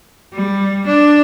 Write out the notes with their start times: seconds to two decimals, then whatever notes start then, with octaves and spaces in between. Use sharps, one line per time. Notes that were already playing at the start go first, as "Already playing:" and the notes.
0.33 G3
0.86 D4